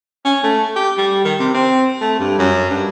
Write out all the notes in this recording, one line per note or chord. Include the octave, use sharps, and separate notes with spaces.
C#4
A3
G4
G3
D#3
C3
C4
A3
G2
F#2
G2